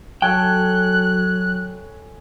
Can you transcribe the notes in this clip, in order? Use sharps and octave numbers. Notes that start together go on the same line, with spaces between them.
F#3 A4 C#5 G5 G#5 F#6